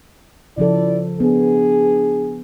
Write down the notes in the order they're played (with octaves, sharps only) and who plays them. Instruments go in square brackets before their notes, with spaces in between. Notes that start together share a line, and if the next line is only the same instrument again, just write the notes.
[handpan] C#3 F3 A4 [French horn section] E4 D5
[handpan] B3 [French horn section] D4 G#4